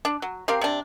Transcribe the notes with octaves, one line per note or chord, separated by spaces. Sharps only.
D4
F#3
C4 G4 A#4 F5
C3 D4